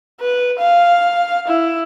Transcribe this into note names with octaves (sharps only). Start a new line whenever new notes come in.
B4
F5
E4